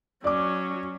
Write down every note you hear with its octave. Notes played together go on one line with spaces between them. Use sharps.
F#3 C#4 D5 D6